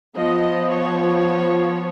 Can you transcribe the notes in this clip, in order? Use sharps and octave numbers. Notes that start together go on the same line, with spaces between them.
F3 B3 D#5
C#5